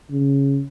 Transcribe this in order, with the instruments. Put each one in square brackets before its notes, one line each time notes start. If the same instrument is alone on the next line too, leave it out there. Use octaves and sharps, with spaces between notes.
[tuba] C#3